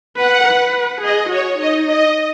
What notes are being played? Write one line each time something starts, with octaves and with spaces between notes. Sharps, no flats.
B4 F#5
B4
G#4 D#5
F#4 C#5
D#4 D#5
D#5